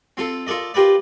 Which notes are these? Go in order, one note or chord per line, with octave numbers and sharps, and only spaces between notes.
C4 F4 A4
F4 A4 A#4 D5 D#5
F4 G4 A#4 B4 D5